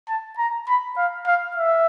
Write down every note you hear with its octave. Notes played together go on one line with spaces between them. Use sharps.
A5
A#5
B5
F5
F5
E5